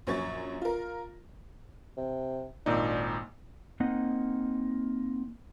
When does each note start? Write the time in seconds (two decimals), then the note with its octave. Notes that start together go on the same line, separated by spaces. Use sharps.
0.07 A#1 F#2 C#5 C#6 A6
0.61 F4 A#4
1.97 C3
2.66 G#1 A#2 D4 D#4
3.80 A#3 C4 D#4 D#5 F#5